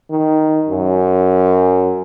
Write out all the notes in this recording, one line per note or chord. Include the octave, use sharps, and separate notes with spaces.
D#3
F#2